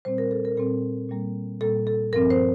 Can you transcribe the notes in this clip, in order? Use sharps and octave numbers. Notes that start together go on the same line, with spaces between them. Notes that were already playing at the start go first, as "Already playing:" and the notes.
A#2 G3 C4 C5
A#4
A4
A#4
A#2 G3 C4 A4
A#2 G3 A#3
A#2 G3 A#3 A4
A4
G2 F3 C4 A#4
C5